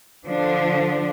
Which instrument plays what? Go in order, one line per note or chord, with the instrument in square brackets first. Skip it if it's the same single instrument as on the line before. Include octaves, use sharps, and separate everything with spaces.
[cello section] D3 F3 D4